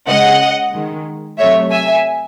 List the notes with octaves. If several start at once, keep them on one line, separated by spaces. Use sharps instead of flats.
C#3 G#3 D#5 F#5
D#3 G#3
C3 F#3 A3 C#5 E5
E5 G#5